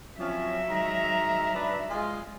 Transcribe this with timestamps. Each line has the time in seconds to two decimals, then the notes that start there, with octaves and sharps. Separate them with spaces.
0.20 F3 F#3 C4 C#4 E5
0.70 D#3 G#3 A#5
1.55 D4 B4
1.90 G#3 F4